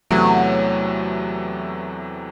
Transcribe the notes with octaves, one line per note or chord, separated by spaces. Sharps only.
E2 C3 E3 F#3 A3